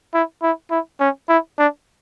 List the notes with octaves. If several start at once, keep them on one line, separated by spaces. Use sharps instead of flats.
E4
E4
E4
C#4
E4
D4